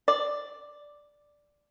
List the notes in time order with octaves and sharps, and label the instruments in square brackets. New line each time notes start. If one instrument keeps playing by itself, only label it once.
[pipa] D5